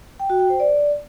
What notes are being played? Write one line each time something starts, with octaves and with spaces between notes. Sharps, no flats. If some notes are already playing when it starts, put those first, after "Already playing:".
G5
F#4
G5
C5
D5